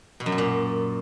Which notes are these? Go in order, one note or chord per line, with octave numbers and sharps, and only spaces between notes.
B2
F#2
B2
A#2